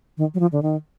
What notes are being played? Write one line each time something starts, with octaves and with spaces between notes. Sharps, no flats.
D#3
F#3
F3
D3
D#3